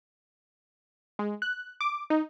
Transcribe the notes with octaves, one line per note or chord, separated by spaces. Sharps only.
G#3
F#6
D6
D#4